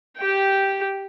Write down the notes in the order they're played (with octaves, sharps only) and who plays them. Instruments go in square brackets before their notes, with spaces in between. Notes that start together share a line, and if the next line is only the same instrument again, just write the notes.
[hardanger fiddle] G4 G5